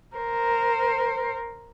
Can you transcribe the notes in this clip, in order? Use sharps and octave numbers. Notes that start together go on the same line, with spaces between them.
A#4 C5